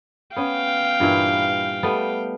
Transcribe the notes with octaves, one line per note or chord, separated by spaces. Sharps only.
B3 C#4 F5 G5
G2 A#2 E3
G3 A3 B3